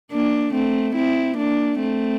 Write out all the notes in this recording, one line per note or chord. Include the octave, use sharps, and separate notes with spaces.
A#3 D4
A3 C4
C4 E4
A#3 D4
A3 C4